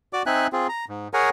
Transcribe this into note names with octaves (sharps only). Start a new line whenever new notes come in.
F#4 D5 D6
C4 D#4 E5 G#5 F#6
C4 F4 G#4
A#5
G#2
G#4 A#4 C#5 F#5 G#5 A#5